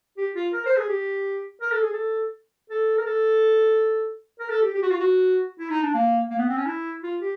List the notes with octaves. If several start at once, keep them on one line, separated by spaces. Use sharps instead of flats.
G4
F4
A#4
C5
G#4
G4
A#4
A4
G#4
A4
A4
A#4
A4
A#4
A4
G4
G4
F#4
F4
F#4
E4
D#4
D4
A#3
A#3
B3
C4
C#4
E4
F4
G4